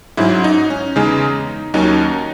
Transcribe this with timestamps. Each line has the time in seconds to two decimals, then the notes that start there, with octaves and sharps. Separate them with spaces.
0.17 G#2 F#3 C#4 E4
0.44 D#4
0.70 C#4
0.96 E2 C#3 G#3 D#4
1.74 D#2 D#3 F#3 C#4 D#4